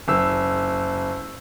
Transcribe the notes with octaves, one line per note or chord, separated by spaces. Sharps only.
F#1 E6